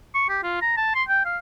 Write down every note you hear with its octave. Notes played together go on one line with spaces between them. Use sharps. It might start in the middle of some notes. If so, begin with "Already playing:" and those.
C#6
G4
F4
A#5
A5
C6
G5
F5